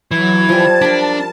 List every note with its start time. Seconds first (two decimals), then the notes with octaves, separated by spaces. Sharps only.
0.11 E3 F#3 G#6
0.49 F3 G3 A5
0.82 D4 A#4 B5